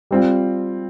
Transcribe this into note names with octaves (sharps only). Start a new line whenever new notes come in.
G3 C4 F4